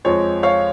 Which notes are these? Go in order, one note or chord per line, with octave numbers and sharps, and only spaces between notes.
F2 F3 G#3 C#5
C#5 F5